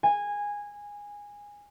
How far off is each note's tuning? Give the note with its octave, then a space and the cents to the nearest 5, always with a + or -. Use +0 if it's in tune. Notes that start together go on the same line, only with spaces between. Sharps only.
G#5 -15